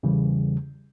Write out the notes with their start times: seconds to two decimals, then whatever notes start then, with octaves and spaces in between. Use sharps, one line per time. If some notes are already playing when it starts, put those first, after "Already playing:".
0.03 E2 C#3 E3 G3